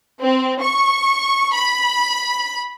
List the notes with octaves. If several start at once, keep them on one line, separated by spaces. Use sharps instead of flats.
C4
C#6
B5